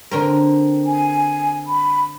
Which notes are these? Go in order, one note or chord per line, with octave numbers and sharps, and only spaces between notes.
D3 C4 A#4
G#5
B5